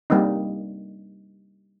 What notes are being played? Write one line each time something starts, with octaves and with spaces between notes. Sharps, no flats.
G3 A#3 C4 D#4